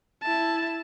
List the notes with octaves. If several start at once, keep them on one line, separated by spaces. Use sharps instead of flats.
E4 A5